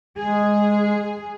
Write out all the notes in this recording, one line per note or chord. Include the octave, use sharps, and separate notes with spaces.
G#3 G#4